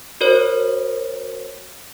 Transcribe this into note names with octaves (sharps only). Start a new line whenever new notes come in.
F#4 A#4 C5 C#5